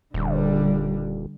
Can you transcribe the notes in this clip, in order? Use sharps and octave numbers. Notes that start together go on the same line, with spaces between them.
D#1 D3 G3